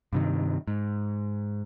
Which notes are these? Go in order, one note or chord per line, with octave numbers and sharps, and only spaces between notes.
G2 C3 D#3
G#2